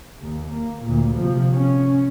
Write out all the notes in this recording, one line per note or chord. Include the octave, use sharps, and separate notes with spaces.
D#2
A#3
D2 A#2
C3 F3
C#4